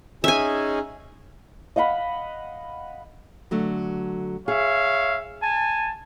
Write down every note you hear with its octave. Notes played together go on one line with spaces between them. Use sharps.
C#4 D#4 G#4 E5 G#5
D#5 F5 F#5 B5
D3 F#3 A3
G#4 C#5 E5 F5
G#5 A5